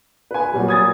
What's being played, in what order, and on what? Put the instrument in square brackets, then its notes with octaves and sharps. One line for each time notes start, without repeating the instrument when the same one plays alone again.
[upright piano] B4 G#5
[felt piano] A#2 F#3 G3
[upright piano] D#6 G#6 A6